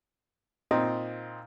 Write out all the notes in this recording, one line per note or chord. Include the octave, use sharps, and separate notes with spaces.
A#2 C4 D#4